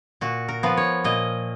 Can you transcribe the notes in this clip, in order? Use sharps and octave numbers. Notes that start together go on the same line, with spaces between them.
A#2 F#4
A#4
F3 B3
C#5
A#2 D#5